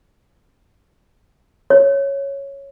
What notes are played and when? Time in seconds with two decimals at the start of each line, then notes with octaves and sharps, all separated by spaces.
1.70 C#5